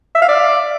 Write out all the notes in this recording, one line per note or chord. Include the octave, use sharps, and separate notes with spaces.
E5
F5
D5